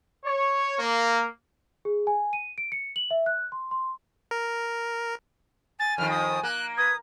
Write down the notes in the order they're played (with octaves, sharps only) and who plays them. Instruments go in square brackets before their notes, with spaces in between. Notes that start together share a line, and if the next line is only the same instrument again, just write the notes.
[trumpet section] C#5
A#3
[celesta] G#4
G#5
D#7
D7
C#7
F#7
E5
F#6
C6
C6
[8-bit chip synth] A#4
[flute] G#5 [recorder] A6
[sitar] F2 D#3 [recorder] F6
[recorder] D#6
[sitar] A#3 [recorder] F#6
[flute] B4 [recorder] D#6 [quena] G#6